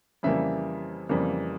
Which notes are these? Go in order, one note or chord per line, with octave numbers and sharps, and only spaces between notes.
F2 C#3 E3 G3 A#3 E5
F2 C#3 E3 G3 A#3